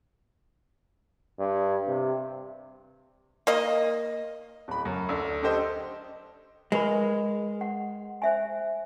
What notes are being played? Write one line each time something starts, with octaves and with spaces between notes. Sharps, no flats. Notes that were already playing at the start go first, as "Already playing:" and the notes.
G2
C3
A#3 D#5
D1 B5
F#2
D2 D4
D4 G4 A4 C5 D#5
G#3 A#4 B4 B5
F#5
C5 E5 G#5